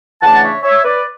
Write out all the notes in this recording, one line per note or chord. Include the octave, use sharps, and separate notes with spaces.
C#3 E3 A3 D4 F#5 A5
F#5
C#5 E5
C#5 E5
B4 D5